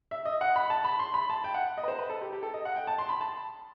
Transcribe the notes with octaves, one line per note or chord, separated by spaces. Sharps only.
E5
D#5
F#5
B5
A5
B5
C6
B5
A5
G5
F#5
D#5
B4
C5
B4
A4
G4
G4
A4
D#5
F#5
G5
A5
C6
B5
A5